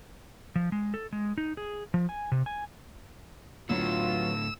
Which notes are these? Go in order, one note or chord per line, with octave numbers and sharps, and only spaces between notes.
F3
G#3
A4
G#3
D#4
G#4
F3
G#5
C3
G#5
A2 D3 F#3 B3 F4 E6